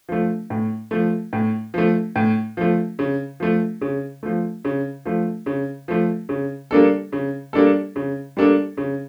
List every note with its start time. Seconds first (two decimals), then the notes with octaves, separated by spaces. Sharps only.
0.09 F3 A3
0.50 A2
0.91 F3 A3
1.33 A2
1.74 F3 A3
2.16 A2
2.57 F3 A3
2.99 C#3
3.40 F3 A3
3.81 C#3
4.23 F3 A3
4.65 C#3
5.05 F3 A3
5.46 C#3
5.88 F3 A3
6.29 C#3
6.71 G3 A#3 D4 A4
7.12 C#3
7.53 G3 A#3 D4 A4
7.96 C#3
8.37 G3 A#3 D4 A4
8.77 C#3